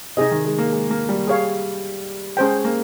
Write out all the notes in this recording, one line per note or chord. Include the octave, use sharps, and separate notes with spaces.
C3 D#4 G#4 D#5
D#3
G#3
A#3
G#3
A#3
G3
G#4 C#5 F5
G#3 C#4 G#4 C5 G5
A#3